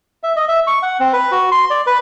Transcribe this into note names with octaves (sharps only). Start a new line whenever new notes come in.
E5
D#5
E5
C#6
F#5
C4
B4
F#4
C6
D5
B4